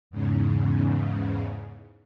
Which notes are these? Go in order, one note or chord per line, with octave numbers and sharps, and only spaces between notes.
E2 G#2 C#3